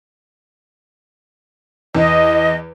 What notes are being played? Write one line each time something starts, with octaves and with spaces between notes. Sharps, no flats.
E2 D#5